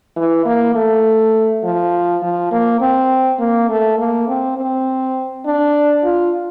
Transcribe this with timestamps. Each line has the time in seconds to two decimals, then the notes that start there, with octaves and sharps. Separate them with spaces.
0.16 E3
0.45 A#3
0.75 A3
1.64 F3
2.22 F3
2.51 A#3
2.81 C4
3.39 A#3
3.69 A3
3.98 A#3
4.28 C4
4.57 C4
5.46 D4
6.04 F4